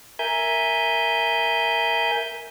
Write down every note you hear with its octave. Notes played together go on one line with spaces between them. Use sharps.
A#4 E5 G#5 G6